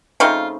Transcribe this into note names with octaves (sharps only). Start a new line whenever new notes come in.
C#3 A3 C4 D#4 F4